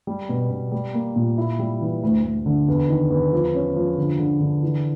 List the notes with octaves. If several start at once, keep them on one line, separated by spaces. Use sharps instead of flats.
G3
B2
B2
G3
A#3
A#2
E4
G3
E3
D2
D2
D3
E2
D#3
E2
F3
C#4
F3
D3
D3
D3
E3